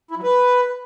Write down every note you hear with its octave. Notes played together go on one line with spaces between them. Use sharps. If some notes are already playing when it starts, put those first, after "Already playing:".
E4
F#3
B4